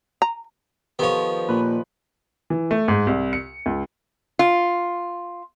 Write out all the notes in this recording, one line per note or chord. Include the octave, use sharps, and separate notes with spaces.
A#5
D#3 F3 B3 G4 A4 C#5 F5
A#2 B4
E3
A3
G#2
C2
C#7
C#2
F4